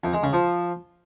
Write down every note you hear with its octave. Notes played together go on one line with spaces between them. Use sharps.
F2
G#3
C#3
F3